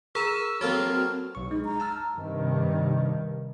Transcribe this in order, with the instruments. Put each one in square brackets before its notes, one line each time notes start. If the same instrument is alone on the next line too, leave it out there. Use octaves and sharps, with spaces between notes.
[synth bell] G#4 A#5 E7 [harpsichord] A#4 [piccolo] E6
[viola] F#3 C4 [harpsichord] A#3 A4 C#5 [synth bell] F#4 [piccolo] F6
[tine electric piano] B1 C#6
[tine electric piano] G#3 [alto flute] D#4
[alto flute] A#5
[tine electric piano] A5 E6 F6
[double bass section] G2 C3 D#3